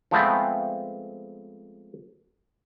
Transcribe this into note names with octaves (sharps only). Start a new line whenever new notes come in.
F3 G#3 A3 B3 C4